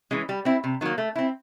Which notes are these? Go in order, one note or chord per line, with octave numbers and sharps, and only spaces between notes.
E3 G#3 C#4
G3
C4 E4
C3
D#3 F#3 A#3
A3
C4 E4